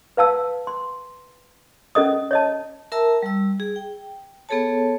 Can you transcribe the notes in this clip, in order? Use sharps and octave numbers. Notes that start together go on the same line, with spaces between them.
B4 F5 A5 E6
C6
C#4 A4 D#5 D#6
C#5 D#5 A5
A#4 E5 A5 A#5 E6
G3 E6
G#4
G5
B3 G#4 A4 C#5 A5